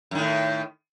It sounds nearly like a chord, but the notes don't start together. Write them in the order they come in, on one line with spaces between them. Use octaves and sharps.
F#2 D#3 A2